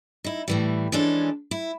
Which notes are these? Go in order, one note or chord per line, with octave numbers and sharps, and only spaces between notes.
D#4 E4
A2 E3 G3
E3 F3 G#3 C#4 D4 A4
E4